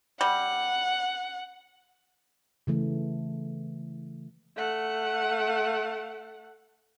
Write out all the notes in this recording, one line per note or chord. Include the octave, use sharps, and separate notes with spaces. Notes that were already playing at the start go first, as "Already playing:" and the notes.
G3 F#5
C#3 E3 A3
A3 F#5